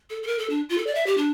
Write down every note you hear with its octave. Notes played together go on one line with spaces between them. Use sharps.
A4
A4
A#4
A4
D4
F4
A4
D5
E5
G4
D4